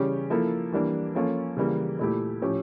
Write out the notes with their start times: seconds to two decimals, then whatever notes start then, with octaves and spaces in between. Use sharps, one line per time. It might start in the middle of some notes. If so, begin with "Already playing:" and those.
Already playing: C#3 E3 G3 C#4 G4
0.30 F3 A#3 E4 A4
0.72 E3 G3 A#3 D4
1.14 F3 A#3 C#4 F4 A4
1.57 C#3 E3 G3 A#3
1.99 A#2 A3 E4 G4
2.42 A2 F3 C#4 G4